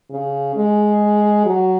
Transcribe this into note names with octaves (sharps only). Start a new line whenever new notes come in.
C#3
G#3
F#3